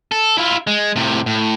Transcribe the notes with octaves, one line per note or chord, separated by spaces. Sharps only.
A4
E4 F4
G#3
A2 C3
A2